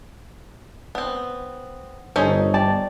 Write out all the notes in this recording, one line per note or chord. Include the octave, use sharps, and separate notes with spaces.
B3 C4
G1 G2 C#4 D#4 A4 C5 C#5
G4 D5 A5